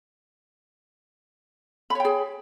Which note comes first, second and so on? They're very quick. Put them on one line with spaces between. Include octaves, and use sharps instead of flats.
B5 C#5 G5 G#4